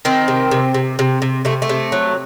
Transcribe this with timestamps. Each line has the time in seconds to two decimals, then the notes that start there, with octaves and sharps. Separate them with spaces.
0.05 D#3 C4
0.28 C3
0.51 C3
0.74 C3
0.99 C3
1.22 C3
1.45 C3 A3
1.62 A3
1.69 C3
1.92 F#3